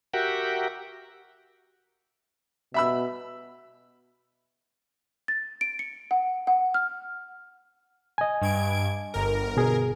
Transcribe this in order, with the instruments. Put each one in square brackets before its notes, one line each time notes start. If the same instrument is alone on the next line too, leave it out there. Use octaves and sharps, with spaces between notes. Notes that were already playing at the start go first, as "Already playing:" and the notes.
[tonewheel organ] F#4 G4 A#4 E5 F#5 G5
[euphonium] B2 [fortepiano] E5 B5 E6
[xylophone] A6
D7
C#7
F#5
F#5
F6
[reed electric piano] D#5 G#5
[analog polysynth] G2 G#6 D7
G1 A#4
[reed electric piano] B2 G#4